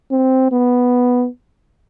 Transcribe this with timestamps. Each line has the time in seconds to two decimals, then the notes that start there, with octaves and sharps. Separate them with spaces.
0.11 C4
0.52 B3